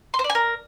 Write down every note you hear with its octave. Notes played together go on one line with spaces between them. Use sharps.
C6
C5
D5
G#5
A#4